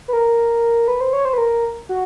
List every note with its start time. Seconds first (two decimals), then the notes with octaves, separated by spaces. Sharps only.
0.08 B4
0.13 A#4
0.88 B4
1.01 C5
1.13 C#5
1.25 C5
1.33 B4
1.38 A#4
1.89 F#4